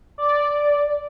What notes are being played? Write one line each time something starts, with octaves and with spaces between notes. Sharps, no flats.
D5